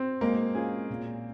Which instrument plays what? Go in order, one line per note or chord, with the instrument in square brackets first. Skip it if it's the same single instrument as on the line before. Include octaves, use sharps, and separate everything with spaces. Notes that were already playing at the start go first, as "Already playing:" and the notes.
Already playing: [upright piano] C4
[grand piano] G#3 [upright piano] A#3
[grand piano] C#4 F4 G#4
A#2